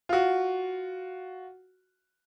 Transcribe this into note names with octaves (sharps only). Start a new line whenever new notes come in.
F4 F#4